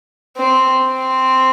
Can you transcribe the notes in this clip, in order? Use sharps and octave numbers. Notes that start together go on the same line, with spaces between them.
C4
C4